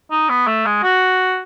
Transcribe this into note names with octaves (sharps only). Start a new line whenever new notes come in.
D#4
B3
A3
G#3
F#4